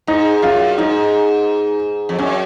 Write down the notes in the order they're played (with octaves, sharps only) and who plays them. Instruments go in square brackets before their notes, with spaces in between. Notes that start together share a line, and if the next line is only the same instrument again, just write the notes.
[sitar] G#2 [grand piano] D#4
[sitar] F#2 [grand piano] F4
[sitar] G#2 [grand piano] D#4
[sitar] F2
[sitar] F#2 [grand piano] C#4